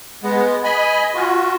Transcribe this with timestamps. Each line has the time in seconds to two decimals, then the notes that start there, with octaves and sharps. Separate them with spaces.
0.23 G#3 B3
0.64 D#5 G#5 B5
1.15 F4 F#4